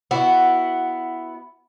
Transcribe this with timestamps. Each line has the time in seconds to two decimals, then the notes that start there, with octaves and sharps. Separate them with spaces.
0.11 B3 E4 F#4